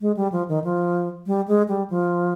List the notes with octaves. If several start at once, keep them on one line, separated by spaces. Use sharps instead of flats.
G#3
G3
F3
D#3
F3
G3
G#3
G3
F3